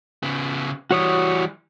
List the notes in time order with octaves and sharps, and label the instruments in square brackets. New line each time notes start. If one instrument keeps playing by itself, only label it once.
[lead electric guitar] C#3 B3
[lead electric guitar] E3 G3 [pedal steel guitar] F#4 C#5 D#6